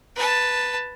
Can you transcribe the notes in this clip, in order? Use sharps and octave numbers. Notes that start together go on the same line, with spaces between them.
B4 A5